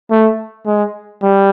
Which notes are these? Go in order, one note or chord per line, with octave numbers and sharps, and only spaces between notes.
A3
G#3
G3